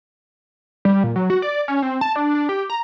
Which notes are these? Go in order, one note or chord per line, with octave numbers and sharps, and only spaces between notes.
G3
A#2
F#3
F#4
D5
C#4
C4
A5
D4
D4
G4
A#5